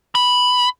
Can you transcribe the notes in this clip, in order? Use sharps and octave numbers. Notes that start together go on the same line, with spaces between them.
B5